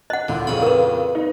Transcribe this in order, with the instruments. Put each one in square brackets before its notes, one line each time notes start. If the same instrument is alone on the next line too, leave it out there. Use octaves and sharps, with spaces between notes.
[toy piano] D#5 F#5 [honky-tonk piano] F#6
[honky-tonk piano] A1 D2 A#2 [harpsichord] D3
[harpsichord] F2 C#3 B5 [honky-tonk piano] A#2
[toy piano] A#4 B4
[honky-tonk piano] B3 D#4